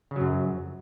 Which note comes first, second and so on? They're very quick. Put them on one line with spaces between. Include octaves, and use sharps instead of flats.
C#3 F#3 F#2